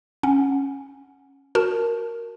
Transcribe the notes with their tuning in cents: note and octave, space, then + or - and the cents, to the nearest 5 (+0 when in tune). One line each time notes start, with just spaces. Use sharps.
C#4 -10 F#5 +0
F#4 +0 A#4 +0 A5 +0